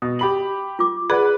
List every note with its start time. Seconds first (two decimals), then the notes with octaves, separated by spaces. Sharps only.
0.02 B2 D#6
0.19 G4 B5 F#7
0.79 F4 D6
1.10 G#4 B4 D5 F#5